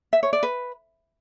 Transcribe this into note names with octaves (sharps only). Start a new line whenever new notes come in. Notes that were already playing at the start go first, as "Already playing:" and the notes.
E5
C#5
D5
B4